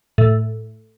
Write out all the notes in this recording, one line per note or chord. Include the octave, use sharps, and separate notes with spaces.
A2